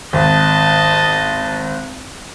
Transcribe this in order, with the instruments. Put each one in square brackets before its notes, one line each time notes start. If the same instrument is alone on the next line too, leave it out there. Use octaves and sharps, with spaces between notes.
[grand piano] G#1 [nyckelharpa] D#5 A5